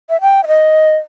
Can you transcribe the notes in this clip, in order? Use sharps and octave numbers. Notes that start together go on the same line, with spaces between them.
E5
G5
E5
D#5